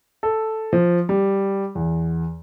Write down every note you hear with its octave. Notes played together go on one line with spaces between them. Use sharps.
A4
F3
G3
E2